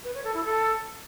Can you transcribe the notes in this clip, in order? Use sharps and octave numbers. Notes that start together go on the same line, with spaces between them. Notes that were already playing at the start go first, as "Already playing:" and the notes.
B4
C#5
A4
E4
A4